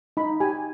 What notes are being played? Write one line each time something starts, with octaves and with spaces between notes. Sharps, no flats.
D#4 B5
G4 G#5